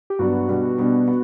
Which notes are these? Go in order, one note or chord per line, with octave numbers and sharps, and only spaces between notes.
G4
G2 F#3 B3 D4 F#4
B2 G3 B3 D4
B2 G3 B3 D4
B3